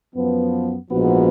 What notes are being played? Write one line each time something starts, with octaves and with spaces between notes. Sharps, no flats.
F#2 F3 B3
A#1 G#2 F3 B3 F#4